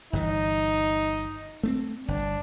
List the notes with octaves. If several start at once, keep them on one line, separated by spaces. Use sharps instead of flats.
G1 G2 E3 D#4
A3 B3 C4
G1 D4